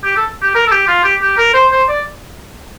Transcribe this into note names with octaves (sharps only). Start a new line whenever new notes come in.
G4
A4
G4
A#4
A4
G4
F4
G4
G4
A#4
C5
C5
D5